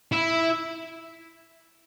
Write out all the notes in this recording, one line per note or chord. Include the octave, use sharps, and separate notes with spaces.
E4